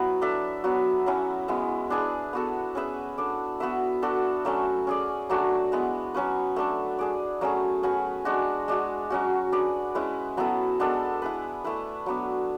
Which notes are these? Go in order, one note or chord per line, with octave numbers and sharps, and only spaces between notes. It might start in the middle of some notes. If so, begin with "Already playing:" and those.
Already playing: F#3 B3 E4 B4
D4 A4 E5
F#3 B3 F#4
F#3 C#4 E4
G#3 B3 E4
D4 G#4 B4
B3 F#4 A4
C#4 G#4 B4 E5
D4 A4 D5
B3 F#4 B4 E5
D4 F#4 A4
F#3 A3 C#4
C#4 G#4 D5
F#3 A3 D4 F#4
G#3 B3 E4
F#3 C#4 F#4 B4
A3 D4 A4
D4 G#4 D5
F#3 A3 C#4 G#4
C#4 F#4 B4
G#3 D4 F#4
G#3 D4 F#4
F#3 C#4 F#4
D4 G#4 B4 D5
G#3 C#4 E4 B4
F#3 B3 E4 A4
G#3 B3 D4 A4
E4 G#4 B4
A3 E4 B4
F#3 B3 D4